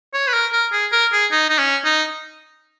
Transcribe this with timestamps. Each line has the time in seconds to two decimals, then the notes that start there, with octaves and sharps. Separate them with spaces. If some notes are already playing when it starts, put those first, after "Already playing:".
0.13 C#5
0.28 B4
0.33 A#4
0.53 A#4
0.73 G#4
0.92 A#4
1.13 G#4
1.32 D#4
1.49 D#4
1.59 C#4
1.85 D#4